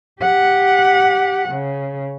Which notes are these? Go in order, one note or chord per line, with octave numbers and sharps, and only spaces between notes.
G4 F#5
C#3